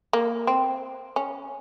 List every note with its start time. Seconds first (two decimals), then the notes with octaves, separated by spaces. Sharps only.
0.13 A#3
0.47 C4
1.16 C#4